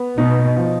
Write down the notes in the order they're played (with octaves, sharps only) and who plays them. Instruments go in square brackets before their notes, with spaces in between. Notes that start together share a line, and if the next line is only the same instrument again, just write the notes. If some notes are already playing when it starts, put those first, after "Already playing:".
Already playing: [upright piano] B3
[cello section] B2 [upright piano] D#4
[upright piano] F3